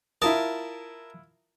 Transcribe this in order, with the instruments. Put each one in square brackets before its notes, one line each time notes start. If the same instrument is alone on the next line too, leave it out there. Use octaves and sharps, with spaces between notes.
[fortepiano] E4 F4 D#6 [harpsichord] A#4 A5